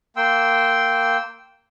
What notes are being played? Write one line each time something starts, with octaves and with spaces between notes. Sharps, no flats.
A#3 G5 C6 E6